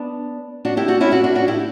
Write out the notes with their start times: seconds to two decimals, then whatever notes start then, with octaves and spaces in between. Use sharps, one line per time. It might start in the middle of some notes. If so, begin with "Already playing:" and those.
Already playing: B3 D4
0.65 D4 F#4
0.77 E4 G4
0.88 D4 F#4
1.00 C#4 E4
1.12 D4 F#4
1.24 D4 F#4
1.35 D4 F#4
1.48 E4 G4